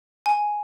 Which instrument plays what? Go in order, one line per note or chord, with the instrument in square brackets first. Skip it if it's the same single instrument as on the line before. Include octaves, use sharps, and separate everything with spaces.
[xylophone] G#5